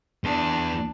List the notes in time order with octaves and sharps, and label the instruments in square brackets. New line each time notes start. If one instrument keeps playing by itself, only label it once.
[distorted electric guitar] E2 [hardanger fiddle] D4